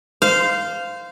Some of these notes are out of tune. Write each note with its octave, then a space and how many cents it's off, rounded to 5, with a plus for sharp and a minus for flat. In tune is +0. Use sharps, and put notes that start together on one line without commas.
C5 -20 F5 -5